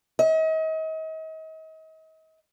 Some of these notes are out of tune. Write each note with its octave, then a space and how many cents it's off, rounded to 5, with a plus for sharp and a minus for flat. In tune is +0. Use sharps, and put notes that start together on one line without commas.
D#5 +40